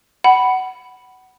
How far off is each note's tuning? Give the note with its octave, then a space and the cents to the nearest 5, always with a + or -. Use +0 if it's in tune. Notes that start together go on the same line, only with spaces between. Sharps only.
F#5 +20 B5 +0